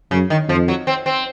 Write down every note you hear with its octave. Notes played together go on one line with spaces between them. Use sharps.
F#2 C#3
D#3
F2 F3
F#3
C4
C4